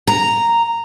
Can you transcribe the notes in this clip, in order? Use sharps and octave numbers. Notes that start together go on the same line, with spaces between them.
A#5